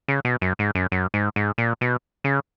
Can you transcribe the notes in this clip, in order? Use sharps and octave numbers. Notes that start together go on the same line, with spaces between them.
C#3
B2
F#2
G#2
F#2
F#2
G#2
G#2
A#2
B2
C#3